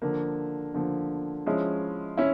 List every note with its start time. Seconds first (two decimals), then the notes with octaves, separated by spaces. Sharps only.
0.02 D3 F3 A#3
0.74 D3 F3 A#3
1.46 F3 G#3 C#4 E4
2.17 C#4 E4